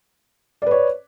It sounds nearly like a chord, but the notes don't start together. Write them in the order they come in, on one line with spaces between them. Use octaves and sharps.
D5 B4 C#5